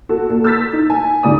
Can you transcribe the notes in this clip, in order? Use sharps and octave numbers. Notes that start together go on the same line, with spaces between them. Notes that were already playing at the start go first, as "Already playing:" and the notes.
F#4 A4
A#2 A4
E6 G6 A6 B6
D#4
G#5
D2 G#2 C#3 F4 D5 D#6